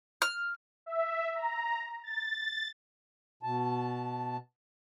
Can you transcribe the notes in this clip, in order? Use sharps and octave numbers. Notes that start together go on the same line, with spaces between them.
F6
E5
A#5
A6
B2 A5